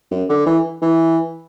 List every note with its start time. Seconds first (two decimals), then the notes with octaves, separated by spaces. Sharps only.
0.11 F#2
0.29 D3
0.46 E3
0.82 E3